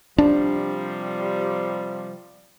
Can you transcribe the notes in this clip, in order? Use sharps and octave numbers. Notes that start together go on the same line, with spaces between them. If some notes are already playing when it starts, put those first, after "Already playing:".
C3 F3 G3 D4